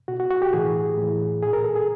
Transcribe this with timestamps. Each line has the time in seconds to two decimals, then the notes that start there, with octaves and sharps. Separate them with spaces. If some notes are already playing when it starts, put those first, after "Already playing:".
0.08 B2 F#4
0.20 F#4
0.30 F#4
0.42 G4
0.53 A2 E3 G#4
0.97 A2 E3
1.42 A#2 G#4
1.53 A#4
1.64 A4
1.76 G#4